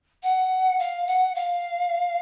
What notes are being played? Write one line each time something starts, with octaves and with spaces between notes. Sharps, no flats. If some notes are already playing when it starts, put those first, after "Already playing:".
F#5
F5
F#5
F5